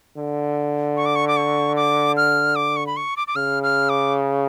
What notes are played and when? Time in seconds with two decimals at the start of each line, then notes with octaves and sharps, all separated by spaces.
0.17 D3
0.97 C#6
1.06 D6
1.16 C#6
1.28 D6
1.37 C#6
1.76 D6
2.17 F6
2.56 D6
2.76 C#6
2.87 B5
2.97 C#6
3.17 D6
3.27 D6
3.36 C#3 F6
3.63 F6
3.89 D6